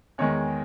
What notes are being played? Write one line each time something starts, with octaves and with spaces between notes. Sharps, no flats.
E2 D#3 G#3 C#5